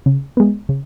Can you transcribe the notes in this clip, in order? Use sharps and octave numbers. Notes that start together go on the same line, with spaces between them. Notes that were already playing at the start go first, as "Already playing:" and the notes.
C#3
G#3 B3
C#3